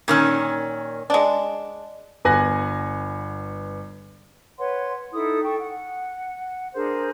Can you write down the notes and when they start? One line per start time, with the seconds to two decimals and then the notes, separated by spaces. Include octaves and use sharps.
0.08 A#2 D#3 C#4
1.10 G#3 D4
2.25 G1 B3 G#5 F#6 A#6
4.58 B4 C#5 F#5 C6
5.13 D#4 E4 A4 D#6
5.44 A4 G5 C#6
5.59 F#5
6.74 D4 G#4 A#4 C5